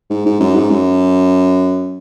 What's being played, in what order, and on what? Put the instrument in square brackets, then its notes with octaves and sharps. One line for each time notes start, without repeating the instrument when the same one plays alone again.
[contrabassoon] G#2
G#2
F#2
G#2
F#2